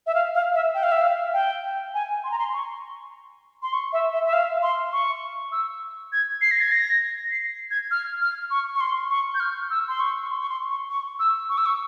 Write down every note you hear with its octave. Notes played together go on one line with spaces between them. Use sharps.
E5
F5
F5
E5
G5
F5
E5
F5
G5
G#5
C6
A#5
C6
C#6
C6
C#6
E5
E5
E5
F5
C6
C#6
E6
G#6
C7
A#6
G#6
A#6
C7
G#6
F6
F6
C#6
C#6
C6
C#6
G6
F6
E6
C6
C#6
C#6
C6
C#6
C6
C#6
C#6
E6
C#6
E6
C#6